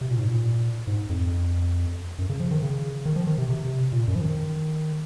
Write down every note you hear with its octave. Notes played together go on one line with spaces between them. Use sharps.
C3
A#2
G#2
A#2
G#2
F2
F#2
C#3
F3
D#3
C#3
D#3
F3
D#3
C3
C3
A#2
F#2
F3
D#3